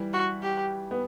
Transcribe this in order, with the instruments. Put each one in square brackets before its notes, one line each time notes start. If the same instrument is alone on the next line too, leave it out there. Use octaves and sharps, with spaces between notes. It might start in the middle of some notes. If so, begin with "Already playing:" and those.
Already playing: [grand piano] E3 G3
[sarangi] F#4
G4
[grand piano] B3